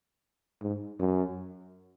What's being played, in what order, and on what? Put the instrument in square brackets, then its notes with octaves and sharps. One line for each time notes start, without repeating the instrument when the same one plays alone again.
[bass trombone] G#2
F#2